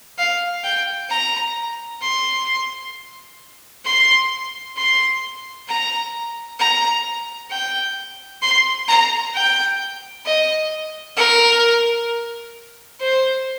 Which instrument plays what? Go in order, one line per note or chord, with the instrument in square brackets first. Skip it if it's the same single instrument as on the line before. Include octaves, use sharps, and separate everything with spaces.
[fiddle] F5
G5
A#5
C6
C6
C6
A#5
A#5
G5
C6
A#5
G5
D#5
A#4
C5